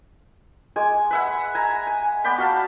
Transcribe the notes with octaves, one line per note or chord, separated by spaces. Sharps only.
G#3 G#5 D6
B4 E5 F#5
G#5 A#5
G#5
B3 D5 G5 B5
F#4 F5 A5